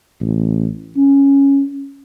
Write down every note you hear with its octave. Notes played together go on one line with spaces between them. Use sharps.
A1
C#4